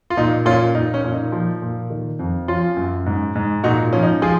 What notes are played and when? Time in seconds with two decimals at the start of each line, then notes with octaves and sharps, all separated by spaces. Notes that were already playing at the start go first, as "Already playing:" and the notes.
0.10 F4
0.17 A#2 D#4
0.46 A#2 C#4 F4
0.75 A#2 D#4
0.94 C#4
1.05 A#2
1.13 D#4
1.32 F3
1.62 A#2
1.90 D#3
2.19 F2
2.48 F3 C#4 F4
2.77 F#2
3.06 G#2
3.35 G#2
3.64 A#2 D#4 F#4
3.93 F3 C#4
4.03 D#4
4.22 F3 F4 G#4